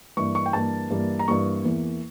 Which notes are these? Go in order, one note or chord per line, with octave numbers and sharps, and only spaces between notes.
G2 E3 G3 A#3 C#6
C#6
G5
G2 E3 G3 A#3 A5
G2 E3 G3 A#3
A#5
G2 E3 G3 A#3 C#6
E2 E3 A#3